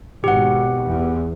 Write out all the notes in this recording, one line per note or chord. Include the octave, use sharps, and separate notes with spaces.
G#1 B2 G4 F#5
E2